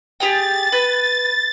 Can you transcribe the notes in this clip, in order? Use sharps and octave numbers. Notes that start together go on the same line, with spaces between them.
G4 G#4 G5 A6
B4